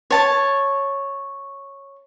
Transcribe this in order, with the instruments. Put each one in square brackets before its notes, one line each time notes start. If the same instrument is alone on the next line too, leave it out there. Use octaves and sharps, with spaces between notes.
[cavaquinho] C#5 A5